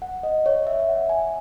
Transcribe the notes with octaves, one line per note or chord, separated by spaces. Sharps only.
F#5
D#5
C#5
E5
E5
F#5
G#5